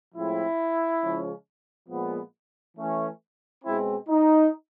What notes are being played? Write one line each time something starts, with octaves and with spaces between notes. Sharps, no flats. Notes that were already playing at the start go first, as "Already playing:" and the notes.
A2 F3 G#3 C4 E4
C#3 F3 G#3 C#4
A#2 F3 G#3 B3
E3 A3 C#4
B2 G#3 C4 E4
D#4